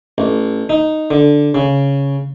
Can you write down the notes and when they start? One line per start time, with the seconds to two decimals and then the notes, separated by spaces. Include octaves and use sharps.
0.18 A1
0.69 D#4
1.11 D3
1.55 C#3